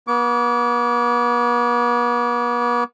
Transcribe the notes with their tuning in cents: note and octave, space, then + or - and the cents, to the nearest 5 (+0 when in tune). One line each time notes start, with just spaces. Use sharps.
B3 -40 D6 -35